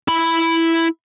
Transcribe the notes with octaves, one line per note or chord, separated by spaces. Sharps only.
E4 B5